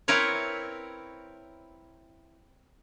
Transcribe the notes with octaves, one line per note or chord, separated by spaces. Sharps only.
C4 E4 A#4 B4 C#5